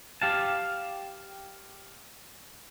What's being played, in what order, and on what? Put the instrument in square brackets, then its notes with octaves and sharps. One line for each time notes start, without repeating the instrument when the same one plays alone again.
[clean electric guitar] G4 F5 A5